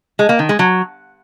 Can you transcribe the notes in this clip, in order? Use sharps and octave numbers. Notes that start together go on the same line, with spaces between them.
G#3
A#3
D#3
G#3
F#3